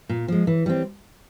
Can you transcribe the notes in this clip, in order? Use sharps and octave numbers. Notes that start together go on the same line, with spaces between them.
A#2
F3 G#3
E3
G3 C4